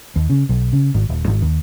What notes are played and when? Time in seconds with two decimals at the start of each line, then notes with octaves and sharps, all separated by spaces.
0.16 D#2
0.30 C#3
0.49 B1
0.73 C#3
0.95 G#1
1.09 D#1
1.28 G#1
1.42 D#2